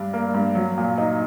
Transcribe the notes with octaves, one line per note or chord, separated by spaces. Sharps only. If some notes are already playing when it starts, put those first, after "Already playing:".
Already playing: G2 D4
A#3
G2
F#3
A#2
D#4